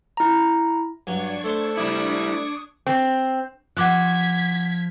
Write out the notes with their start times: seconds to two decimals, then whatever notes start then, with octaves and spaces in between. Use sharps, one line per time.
0.17 E4 A#5
1.07 G2 F#3 D4 G#5 C#6 G#6
1.44 A3 A4 C5 A5
1.77 G3 E4 D6 D#6
2.87 C4
3.77 F3 F#5 D6 F#6 G#6 B6